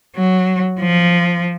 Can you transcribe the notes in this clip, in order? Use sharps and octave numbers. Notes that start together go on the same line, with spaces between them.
F#3
F3